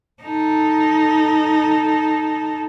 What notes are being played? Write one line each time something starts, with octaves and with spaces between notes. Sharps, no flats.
D#4 A4